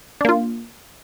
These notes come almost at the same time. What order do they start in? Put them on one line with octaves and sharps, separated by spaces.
D4 A#3 F4